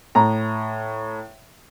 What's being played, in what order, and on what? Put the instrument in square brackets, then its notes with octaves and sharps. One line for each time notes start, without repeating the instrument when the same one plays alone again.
[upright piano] A2 A#5